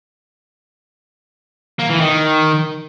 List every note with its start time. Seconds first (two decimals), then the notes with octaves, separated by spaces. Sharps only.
1.79 A#3
1.90 E3
2.00 D#3